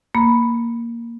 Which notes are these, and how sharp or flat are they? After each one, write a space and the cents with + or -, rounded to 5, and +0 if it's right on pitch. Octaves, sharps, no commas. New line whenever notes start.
A#3 +0 B5 +0